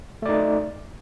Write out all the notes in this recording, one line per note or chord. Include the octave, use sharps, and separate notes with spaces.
A3 D#4 D5